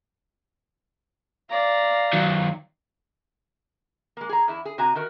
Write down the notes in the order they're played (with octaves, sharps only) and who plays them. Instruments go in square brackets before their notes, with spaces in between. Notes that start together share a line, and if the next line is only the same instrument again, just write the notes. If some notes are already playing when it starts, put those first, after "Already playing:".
[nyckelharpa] D5 A#5 [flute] F5
[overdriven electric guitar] D#3 F#3
[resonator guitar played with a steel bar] G#3 A#3
G#4 A#5
E2 E4
G#4
C3 F#4 G#5 A#5
D#3 F#4 A#4